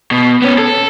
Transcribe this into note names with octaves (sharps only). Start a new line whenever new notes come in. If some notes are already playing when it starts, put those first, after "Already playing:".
B2
B3 C#4
A4